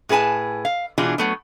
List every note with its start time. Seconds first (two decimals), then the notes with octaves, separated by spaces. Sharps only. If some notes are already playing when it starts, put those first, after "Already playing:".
0.09 A2 G#4 B4 G#5 A5
0.65 F5
0.98 B2 E3 D4 F4 G#4
1.18 F#3 A3 B3